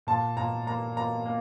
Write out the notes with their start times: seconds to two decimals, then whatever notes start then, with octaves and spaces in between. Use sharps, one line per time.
0.07 A#2 A5
0.37 A#2 A#5
0.66 A#3 A#5
0.96 A#3 A#5
1.25 A#3